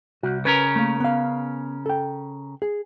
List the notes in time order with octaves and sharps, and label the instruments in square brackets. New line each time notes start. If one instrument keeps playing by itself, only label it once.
[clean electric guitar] C2 [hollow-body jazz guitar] F#4
[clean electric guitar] C#3 C#4 A#4 [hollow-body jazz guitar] B4
[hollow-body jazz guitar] A3 A#3
B3 F5
A4 G5
G#4